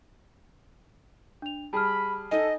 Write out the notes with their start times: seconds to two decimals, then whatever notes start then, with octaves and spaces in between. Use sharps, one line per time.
1.42 D4 F7
1.73 G3 G#4 A5 B5 F6
2.31 D#4 A4 D#5 G#5